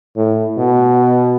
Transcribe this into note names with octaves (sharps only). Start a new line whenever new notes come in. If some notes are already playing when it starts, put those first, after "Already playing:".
A2
B2